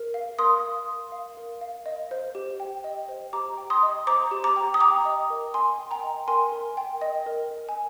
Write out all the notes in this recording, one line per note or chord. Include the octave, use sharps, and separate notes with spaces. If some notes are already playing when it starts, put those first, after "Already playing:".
Already playing: A#4
F5
A#4 C6 D#6
F5
A#4
F5
A#4
F5
D#5
C5
G4
G5
D#5
C5
G4 A#5 D6
G5
C6 D#6
D#5
C5 A#5 D6
G4
A#5 D6
G5
D#6
G5 A#5 D6
D#5
A#4
A#4 G#5 C6
G5
G5 A#5
D#5
A#4 G#5 C6
A#4
G5
D#5
A#4
A#4
G#5